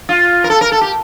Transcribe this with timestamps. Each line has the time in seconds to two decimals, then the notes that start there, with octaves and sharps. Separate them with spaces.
0.09 F4
0.44 A#4
0.50 A4
0.61 A#4
0.72 A4
0.81 G4